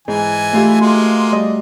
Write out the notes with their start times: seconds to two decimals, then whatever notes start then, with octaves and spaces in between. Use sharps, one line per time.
0.08 G#2 E3 G#5
0.53 A3 F4 G4
0.81 G#3 A#3 F#4 C6
1.32 G3 D#5